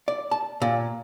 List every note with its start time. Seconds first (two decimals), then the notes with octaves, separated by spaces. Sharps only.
0.08 D5
0.31 A5
0.62 A#2